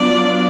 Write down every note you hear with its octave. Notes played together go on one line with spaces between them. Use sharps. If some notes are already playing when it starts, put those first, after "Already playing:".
Already playing: F#3 B3 D4 F4 D5